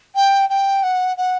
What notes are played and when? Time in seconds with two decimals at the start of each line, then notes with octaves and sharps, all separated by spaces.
0.15 G5
0.49 G5
0.83 F#5
1.17 F#5